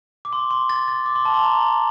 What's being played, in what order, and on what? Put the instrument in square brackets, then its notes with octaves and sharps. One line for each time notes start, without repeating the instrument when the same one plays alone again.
[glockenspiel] D6
C6
C6
A6
A6
D6
C6
A5
C6
A#5
C6